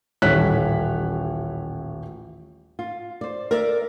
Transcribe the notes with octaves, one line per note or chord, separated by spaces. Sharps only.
D#1 A1 C#5 F#6 B6
F4
C5 D5
A#4 D5 E5